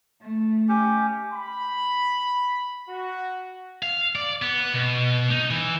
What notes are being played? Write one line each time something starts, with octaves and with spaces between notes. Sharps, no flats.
A3
C#4 G4
B5
F#4
F5
D5
B3
B2
D#4
E3